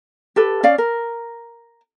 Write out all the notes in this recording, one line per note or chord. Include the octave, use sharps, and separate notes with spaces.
G4 A4 B4
C#4 D5 F5
A#4